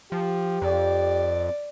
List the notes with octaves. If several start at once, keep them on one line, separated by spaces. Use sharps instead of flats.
F3 G4
F2 D5